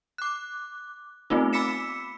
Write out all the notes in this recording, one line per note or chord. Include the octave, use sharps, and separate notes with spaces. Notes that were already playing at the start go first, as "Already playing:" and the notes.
D6 F#6
A3 B3 C4 D#4 F4
B5 D6 E6 B6 C#7 E7